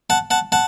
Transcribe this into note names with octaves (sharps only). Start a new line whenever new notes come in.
F#5 A5
F#5 A5
F#5 A5